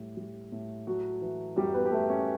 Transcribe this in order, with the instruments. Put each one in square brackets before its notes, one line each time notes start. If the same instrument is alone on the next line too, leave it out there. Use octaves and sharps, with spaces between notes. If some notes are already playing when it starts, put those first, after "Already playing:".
Already playing: [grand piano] A2 G3
G3
A2
F#3 A3 F#4
E3
F#2 G3 G4
B3 B4
G4
F#2 A3 A4
C#4